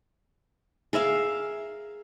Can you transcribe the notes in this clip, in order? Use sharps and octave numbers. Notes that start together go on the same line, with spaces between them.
G#4 A#4 E5 F5